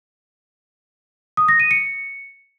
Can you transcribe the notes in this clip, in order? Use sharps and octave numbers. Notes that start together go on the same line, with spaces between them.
D#6
A#6
D#7
C#7